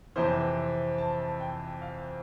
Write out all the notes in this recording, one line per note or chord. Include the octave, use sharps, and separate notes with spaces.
F2 C3 E3 C5
A5
G5
F5